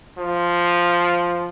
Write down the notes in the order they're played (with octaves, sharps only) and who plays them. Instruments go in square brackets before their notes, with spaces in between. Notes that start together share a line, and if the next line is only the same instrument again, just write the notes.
[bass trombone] F3